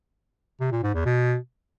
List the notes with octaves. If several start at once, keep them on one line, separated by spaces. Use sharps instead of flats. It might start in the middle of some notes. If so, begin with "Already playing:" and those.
C3
A#2
G#2
E2
B2